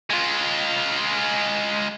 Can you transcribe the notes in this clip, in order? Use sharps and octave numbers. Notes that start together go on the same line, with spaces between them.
G#3 F4